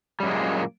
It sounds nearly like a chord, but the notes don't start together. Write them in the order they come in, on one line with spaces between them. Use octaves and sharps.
G3 F#2 G#3 A#3 A#2